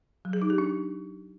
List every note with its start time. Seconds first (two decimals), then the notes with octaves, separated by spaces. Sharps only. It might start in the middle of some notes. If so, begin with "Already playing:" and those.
0.25 F#3
0.33 G#4
0.42 D#4
0.50 G4
0.58 D4